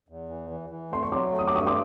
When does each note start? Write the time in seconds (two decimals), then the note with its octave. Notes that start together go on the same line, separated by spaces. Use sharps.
0.09 E2
0.29 E3
0.50 E3
0.70 E3
0.91 A3 C6
1.03 C#6
1.11 F#3 C6 D6
1.32 A3
1.39 D#6
1.47 D6
1.53 G2 C#6 D#6
1.67 C6 D6